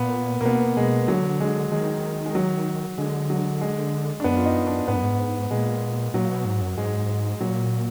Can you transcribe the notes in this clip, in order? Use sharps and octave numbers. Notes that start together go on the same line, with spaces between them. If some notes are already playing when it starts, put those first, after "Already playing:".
Already playing: A#2 B3
A#2 A#3
B2 B3
B2 G#3
D3 F#3
G#3
D#3 G#3
G#3
F#3
D3 G#3
F#3
G#3
D4
F#2 B3
F4
D#4
D4
G#2 B3
F#2
G#2
A#2 G#3
A#2 F#3
B2
G#2
F#2
G#2 G#3
A#2 F#3